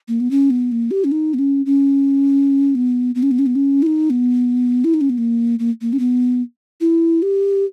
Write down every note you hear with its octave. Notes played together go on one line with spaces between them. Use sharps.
A#3
B3
C#4
B3
A#3
G4
C#4
D#4
B3
C#4
C#4
B3
B3
C#4
B3
C#4
B3
C#4
E4
D#4
B3
E4
D#4
C#4
B3
A#3
A#3
A#3
C#4
B3
E4
G4